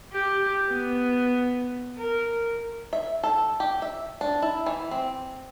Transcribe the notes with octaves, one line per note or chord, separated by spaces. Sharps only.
G4
B3
A#4
E5
A4
G4
E5
D4
E4
E3
C4